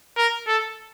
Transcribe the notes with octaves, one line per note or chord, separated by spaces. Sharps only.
A#4
A4